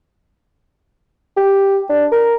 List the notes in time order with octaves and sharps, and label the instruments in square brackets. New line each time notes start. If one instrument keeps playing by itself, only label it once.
[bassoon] G4
D4
A#4